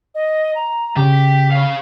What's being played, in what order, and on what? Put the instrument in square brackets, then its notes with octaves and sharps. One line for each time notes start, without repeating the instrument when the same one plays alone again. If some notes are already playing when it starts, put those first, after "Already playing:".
[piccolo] D#5
A#5
[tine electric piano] C#3 [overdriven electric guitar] G4
[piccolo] B6
[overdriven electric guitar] C#5 F5